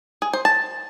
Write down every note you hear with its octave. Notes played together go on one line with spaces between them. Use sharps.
G#4
C5
A5